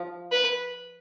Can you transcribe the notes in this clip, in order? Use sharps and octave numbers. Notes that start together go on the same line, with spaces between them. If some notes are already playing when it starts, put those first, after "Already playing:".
Already playing: F3
B4